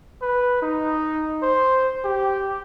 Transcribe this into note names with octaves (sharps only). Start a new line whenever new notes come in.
B4
D#4
C5
G4